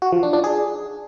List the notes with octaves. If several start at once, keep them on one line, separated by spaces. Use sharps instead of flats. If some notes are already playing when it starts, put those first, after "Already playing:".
F#4
F3
D4
D4
G#4